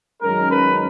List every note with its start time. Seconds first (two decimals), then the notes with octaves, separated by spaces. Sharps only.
0.22 F#2 D#3 G#3 C#4 A#4
0.52 B4